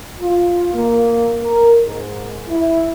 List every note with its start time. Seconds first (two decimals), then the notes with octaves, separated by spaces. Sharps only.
0.19 F4
0.73 A#3
1.41 A#4
1.84 G#2
2.48 E4